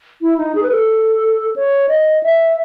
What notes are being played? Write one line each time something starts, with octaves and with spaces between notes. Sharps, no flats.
E4
D#4
G#4
B4
A4
C#5
D#5
E5